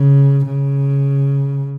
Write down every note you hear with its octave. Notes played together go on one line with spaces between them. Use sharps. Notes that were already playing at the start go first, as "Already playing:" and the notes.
Already playing: C#3
C#3